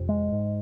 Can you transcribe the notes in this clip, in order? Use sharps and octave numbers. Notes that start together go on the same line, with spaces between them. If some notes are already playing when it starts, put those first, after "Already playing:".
Already playing: F2 C3
G#3
G#2